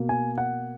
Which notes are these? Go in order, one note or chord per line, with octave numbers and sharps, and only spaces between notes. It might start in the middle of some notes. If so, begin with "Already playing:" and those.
Already playing: B2 A#3
G#5
F#5